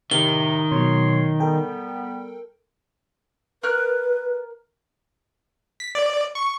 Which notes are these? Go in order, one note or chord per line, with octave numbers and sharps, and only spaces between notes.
A2 C3 D#3 G7
B2 F#3 C#5 C6
G3 B3 A4 A#4 G5
A#4 B4 F6 F#6
B6
D5
C#6